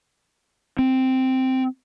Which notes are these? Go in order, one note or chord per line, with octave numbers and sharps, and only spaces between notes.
C4